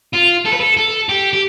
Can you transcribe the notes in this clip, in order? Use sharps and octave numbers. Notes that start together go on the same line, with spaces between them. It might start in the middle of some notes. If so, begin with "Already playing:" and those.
F4
A4
B4
A4
A4
G4
G4